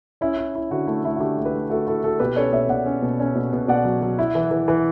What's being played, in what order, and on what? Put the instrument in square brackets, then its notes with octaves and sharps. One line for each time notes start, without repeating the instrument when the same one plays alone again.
[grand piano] C#4 E4
E4
E4
D3 F#4
A3 E4
A3 E4
F#4
D3 E4 G4
A3
G4 B4
A3
A3 F#4 A4
E4 F#4 A4
E4 F#4 A4
B2 G4 B4
C#4 A4 C#5
B2 C#5 E5
B2 D5 F#5
C#4
B2
C#4
B2
B2
B2 D5 F#5
F#3
F#3
E4
E3
E3
E3